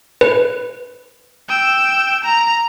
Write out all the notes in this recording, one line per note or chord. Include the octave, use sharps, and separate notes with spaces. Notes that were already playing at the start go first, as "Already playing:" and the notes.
B4
G5 E6
A#5